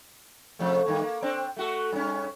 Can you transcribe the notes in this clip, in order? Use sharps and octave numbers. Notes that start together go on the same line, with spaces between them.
C3 F3 A3
G2 D#3 A#3
A#3
C4 D4
A3 F#4 A4
G2 C#4